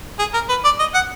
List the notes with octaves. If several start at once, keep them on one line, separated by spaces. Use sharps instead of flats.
G#4
A#4
B4
D5
D#5
F#5